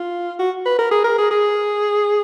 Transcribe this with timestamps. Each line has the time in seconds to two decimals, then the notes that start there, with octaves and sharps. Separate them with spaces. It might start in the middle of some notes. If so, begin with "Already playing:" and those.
Already playing: F4
0.39 F#4
0.65 B4
0.79 A#4
0.91 G#4
1.04 A#4
1.18 G#4
1.31 G#4